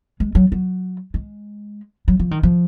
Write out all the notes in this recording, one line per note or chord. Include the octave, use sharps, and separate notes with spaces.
G#3
F#3
F#3
G#3
F#3
F3
D#3
F3